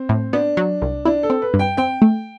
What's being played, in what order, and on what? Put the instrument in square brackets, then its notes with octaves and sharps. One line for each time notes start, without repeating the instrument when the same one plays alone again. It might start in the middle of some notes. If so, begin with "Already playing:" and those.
Already playing: [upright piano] C4
[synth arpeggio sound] A2
[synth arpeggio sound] B3 [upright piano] D4
[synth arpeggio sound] F#3
C2
[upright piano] D4 [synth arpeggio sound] E4
[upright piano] A4
[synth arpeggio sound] C4
[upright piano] B4
[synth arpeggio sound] G2
[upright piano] G5
[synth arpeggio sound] C4 [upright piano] G5
[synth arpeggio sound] A3